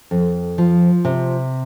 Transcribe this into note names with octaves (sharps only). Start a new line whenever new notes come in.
F2
F3
C3